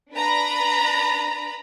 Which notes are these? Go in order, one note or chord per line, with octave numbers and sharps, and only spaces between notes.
D4 B4 A#5 B5